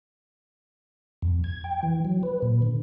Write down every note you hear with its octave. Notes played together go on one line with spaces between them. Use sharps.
F2
G#6
G5
E3
F#3
B4
A#2
D3